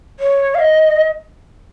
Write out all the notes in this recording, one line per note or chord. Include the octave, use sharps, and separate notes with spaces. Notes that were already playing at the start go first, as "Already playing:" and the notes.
C#5
F5
D#5